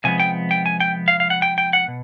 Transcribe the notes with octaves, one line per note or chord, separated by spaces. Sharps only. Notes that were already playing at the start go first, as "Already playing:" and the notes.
C3 F3 G#3 B3 G#5
G5
G5
G#5
G5
F5
F5
F#5
G5
G5
F#5
B2